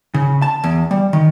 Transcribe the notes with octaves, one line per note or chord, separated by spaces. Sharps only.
C#3
A5
E2
G3
D#3